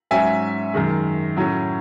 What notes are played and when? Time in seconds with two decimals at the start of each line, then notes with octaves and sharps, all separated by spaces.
0.11 G#2 F#3 C#4 E5 G#5
0.74 F#2 D#3 G#3
1.37 A2 F#3 C#4